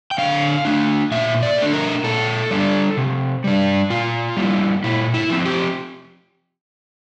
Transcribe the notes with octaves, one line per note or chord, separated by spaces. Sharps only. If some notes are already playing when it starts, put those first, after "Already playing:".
G5
D3 F5
A3 D4
A#2 E5
D5
A3 D4
A#4
A#2 A4
G3 D4
C3
G3 D4
A#2 F4
G3 A#3 E4
A#2 E4
E4
F3 C4
G4